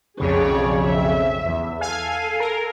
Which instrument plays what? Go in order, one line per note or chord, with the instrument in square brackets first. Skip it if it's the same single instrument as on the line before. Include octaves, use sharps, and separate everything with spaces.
[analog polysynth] B1 F2 C#3 [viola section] G#4 C#5 D5
[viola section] E5
[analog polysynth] E2
[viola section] A4 [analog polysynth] F5 G#5
[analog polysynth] A#4